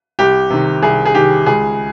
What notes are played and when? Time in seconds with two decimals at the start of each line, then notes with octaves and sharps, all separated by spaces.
0.19 C2 G4
0.50 C3 D#3
0.82 C2 G#4
1.05 G#4
1.14 C3 D#3 G4
1.46 C#2 G#4